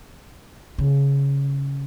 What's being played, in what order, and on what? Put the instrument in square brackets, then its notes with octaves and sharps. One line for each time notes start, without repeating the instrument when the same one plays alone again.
[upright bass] C#3